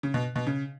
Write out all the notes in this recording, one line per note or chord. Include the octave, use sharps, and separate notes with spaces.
C#3
B2
B2
C#3